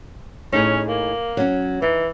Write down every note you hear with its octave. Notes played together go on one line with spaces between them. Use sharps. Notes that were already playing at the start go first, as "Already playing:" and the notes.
A2 C#4 D#4 G#4
A#3
F#3 C#4
E3 D#4